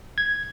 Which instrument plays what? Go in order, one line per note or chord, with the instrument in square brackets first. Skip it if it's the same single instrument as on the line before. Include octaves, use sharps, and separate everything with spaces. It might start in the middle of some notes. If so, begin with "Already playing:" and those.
[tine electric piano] G#6